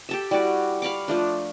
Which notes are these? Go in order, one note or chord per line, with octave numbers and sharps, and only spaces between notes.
G4 A4 E5
G3 E4 F#4 D5
F5 B5 C#6 D6
F3 A3 D4